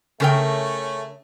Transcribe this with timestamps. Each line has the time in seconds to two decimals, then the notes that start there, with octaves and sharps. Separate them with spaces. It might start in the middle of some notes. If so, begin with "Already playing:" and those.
0.20 C#3 A3 C#4 A#4 G5